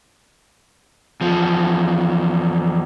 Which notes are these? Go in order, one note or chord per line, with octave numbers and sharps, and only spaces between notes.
E2 F3